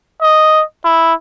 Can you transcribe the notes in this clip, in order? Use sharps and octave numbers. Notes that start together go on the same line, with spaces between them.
D#5
E4